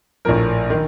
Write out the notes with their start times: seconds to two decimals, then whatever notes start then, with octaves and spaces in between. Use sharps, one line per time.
0.25 A#1 A2 F3 A#4
0.70 D#3